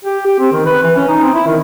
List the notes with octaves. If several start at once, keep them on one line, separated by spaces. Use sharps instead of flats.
G4
G4
C4
D#3
B4
E3
C#4
D#4
C4
E4
D#3